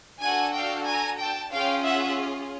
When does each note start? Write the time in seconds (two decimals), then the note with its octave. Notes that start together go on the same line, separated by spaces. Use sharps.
0.22 D4 F#4 A4 F#5 G#5
0.55 F5 G5
0.87 G#5 A#5
1.20 G5 A5
1.53 C#4 F4 G#4 F5 G5
1.85 E5 F#5